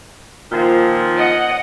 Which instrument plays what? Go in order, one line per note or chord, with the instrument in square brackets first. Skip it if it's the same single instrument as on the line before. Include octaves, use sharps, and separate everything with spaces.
[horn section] A#2 D#3 F3
[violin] D#5 F#5